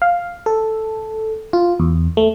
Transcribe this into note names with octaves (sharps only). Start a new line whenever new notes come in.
F5
A4
F4
E2
A3